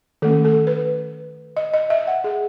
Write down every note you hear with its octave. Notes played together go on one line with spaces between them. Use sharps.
D#3 A3 C#4 A4
A4
B4
D#5
D#5
E5
F#5
G#4